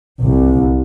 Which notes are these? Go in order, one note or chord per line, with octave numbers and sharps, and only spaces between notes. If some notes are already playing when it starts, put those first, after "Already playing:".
C2